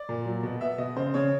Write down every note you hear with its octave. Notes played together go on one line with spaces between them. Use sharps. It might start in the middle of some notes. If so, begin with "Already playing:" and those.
Already playing: D5
A#2
F#3
B2
B3 E5
B2 D#5
C#3 C5
C#3 C#5